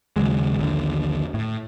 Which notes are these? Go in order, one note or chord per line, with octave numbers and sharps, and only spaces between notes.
D#2 C#3 F#3 G#3
A#1 D#2 D3
A2